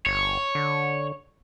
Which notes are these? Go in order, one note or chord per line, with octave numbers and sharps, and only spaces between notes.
G1 C#5
D3